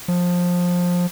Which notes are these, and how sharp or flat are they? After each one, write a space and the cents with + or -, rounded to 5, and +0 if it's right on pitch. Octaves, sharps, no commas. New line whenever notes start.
F3 +20